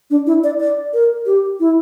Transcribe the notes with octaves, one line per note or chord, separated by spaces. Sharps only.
D4
E4
D5
D5
A#4
G4
E4